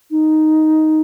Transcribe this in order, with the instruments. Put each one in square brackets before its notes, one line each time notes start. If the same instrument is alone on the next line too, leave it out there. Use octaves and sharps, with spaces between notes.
[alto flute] D#4